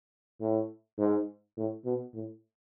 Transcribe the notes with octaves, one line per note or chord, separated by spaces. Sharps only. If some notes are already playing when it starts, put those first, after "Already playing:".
A2
G#2
A2
B2
A2